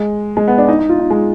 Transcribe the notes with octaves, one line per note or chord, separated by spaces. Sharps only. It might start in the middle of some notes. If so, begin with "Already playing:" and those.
Already playing: G#3
G#3
B3
D4
D#4
D#4
F4
D#4
G#3